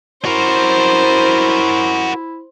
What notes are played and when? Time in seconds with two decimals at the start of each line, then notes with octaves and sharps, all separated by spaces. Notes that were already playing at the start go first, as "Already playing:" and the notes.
0.25 E4 F#4 A#4 C5